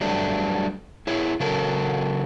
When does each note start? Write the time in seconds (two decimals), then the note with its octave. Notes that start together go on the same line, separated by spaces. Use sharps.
0.01 F#3 G3 A3 D4
1.07 E4 G#4 C#5
1.40 C#3 F#3 A4 A#4